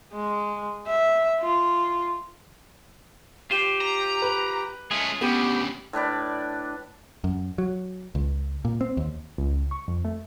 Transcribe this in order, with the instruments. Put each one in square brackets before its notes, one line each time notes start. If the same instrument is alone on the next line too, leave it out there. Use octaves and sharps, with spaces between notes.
[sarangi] G#3
E5
F4
[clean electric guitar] F4 C5 [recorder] G4
[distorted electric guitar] A#5
[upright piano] B4
[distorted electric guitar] G#3 A3 [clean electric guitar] C#4 F4 G#4
[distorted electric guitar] D2 C#3 [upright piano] B3 D#7 [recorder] G4
[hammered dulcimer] A2 D4 B4 D5
[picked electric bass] F#2
F#3
C#2
A#2
C4
D#2
[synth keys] C#2
C#2
C#6
F2
A3